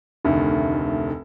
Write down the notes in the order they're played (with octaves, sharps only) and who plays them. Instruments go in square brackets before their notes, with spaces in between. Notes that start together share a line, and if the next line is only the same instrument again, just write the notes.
[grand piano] F1 D2 D#3